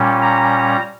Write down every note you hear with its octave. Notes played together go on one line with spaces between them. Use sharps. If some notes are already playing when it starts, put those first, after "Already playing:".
Already playing: A#2 G3 C#4
A#5